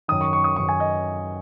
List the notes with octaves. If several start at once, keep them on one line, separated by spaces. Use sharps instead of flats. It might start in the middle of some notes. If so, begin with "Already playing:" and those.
F#2 D#3 D#6
C#6
C#6
D#6
F#2 D#3 C#6
G#5
D#5